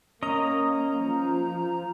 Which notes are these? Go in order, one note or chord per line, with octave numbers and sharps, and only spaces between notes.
A#3 C#4 D#5 A#5
F3